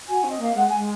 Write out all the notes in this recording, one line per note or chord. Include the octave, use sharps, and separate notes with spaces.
F#4 G#5
C4
D#5
A#3 F5
G#3 F#5
G#5
G#3